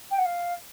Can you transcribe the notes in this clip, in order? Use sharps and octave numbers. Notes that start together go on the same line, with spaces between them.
G5
F#5
F5